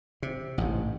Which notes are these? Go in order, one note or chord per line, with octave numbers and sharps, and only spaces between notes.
C3
A1 G#2